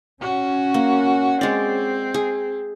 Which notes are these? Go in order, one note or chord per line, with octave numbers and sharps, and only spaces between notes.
C#4 F#4
A#3
G#3 C4 D5
G#4